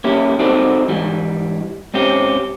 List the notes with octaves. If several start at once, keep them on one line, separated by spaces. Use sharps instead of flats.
A#3 C#4 E4 G4
C4 D#4 F#4 A4 C5 D5
G#2 E3 G3
G#2 C4 C#4 G4